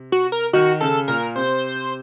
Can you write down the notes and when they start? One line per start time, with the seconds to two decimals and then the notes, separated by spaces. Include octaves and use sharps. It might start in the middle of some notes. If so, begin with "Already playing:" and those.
Already playing: C3
0.12 F#4
0.32 A#4
0.53 D#3 F#4
0.81 C#3 A4
1.08 A#2 A#4
1.35 C3 C5